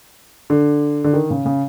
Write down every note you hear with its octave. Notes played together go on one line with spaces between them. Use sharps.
D3
D3
D#3
C#3
C#3